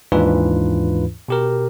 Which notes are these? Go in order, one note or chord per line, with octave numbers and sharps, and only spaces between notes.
D#2 G#2 E3 D4 F4 B4
B2 G4 A#4